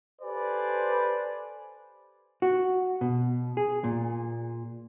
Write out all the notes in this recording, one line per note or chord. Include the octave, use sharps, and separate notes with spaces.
G4 A4 B4 C5 D5 G#5
F#4
B2
G#4
A#2